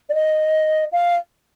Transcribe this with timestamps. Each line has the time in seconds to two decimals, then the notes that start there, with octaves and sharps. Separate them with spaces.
0.09 D5
0.14 D#5
0.92 F5